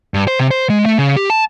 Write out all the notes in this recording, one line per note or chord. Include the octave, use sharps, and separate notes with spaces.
G2
C5
C3
C5
G#3
A3
C#3
G4
A5